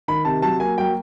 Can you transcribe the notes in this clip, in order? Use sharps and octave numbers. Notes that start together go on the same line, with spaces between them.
D#3 B5
C3 A5
F#3 A5
A#3 G#5
F#3 G5